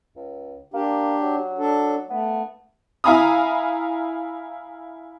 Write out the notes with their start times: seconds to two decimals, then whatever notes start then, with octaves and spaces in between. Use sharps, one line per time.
0.16 C#2
0.74 A#3 D4 G4
1.22 F#3
1.58 D4 A4
2.10 A3 B3
3.04 E4 F5 G#5 A#5 B5 D#6